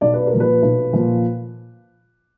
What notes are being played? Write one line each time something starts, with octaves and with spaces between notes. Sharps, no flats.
B1 D5
B4
A#4
A#2 F3
B4
B1
A#2 F3